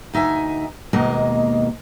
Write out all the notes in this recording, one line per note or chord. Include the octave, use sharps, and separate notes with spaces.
D2 D#4 E5 F#5 G#5
D#2 B2 G#3 A#3 D#5